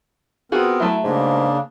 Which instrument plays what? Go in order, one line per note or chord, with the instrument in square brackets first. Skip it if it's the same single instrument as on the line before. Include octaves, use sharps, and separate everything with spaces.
[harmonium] B3 C4 A#4 [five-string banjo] F4 F#4 G#4
[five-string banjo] F#3 A3 [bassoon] E4
[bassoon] G#2 [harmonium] C#3 A#3 D4